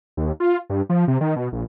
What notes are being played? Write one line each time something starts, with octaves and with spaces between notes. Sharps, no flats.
D#2
F4
G2
F3
C3
D#3
B2
A#1